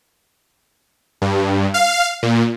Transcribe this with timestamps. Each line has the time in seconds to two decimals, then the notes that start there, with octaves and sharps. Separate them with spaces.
1.22 G2
1.74 F5
2.23 A#2